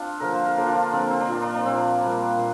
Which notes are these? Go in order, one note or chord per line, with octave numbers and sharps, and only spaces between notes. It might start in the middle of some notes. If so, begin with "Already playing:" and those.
Already playing: C4 D4 F4
D3 F3 A#3 A#4
C5
A#4
D3 F3 A#3 D4
F4
D4
D3 F3 A#3 C4
C4
D4
A#2 A#3 F4
D4
D4
A#2 A#3 C4
A#2 G3 A#3
A#2